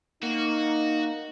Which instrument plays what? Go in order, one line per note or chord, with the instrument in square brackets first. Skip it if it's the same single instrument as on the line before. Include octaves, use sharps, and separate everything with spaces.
[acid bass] A#3 [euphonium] D#4 [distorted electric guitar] F#4